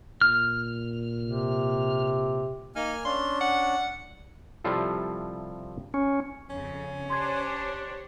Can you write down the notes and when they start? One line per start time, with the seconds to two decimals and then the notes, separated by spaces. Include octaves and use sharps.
0.21 A#2 F6
1.22 C3
2.76 A#3 D#4 G#5 F6
3.05 C#4 D4 C6
3.41 F#5
4.64 C3 F3 G3 E4 F4 A4
5.94 C#4
6.50 F2 C#3 C#4
7.10 D4 G4 C5 C#5 C6 G#6